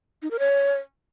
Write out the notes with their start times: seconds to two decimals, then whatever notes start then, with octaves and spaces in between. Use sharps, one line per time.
0.22 D#4
0.31 A#4
0.39 C#5